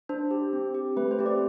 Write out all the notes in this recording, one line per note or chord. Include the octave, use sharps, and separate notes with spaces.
D4 C5
G4
C4
G4
A3 B4
C5
C4 G4
D5